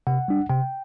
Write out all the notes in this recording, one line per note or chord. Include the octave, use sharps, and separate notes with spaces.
C3 F#5
G3 D4
C3 G5